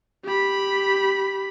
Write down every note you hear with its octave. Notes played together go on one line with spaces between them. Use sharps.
G4 B5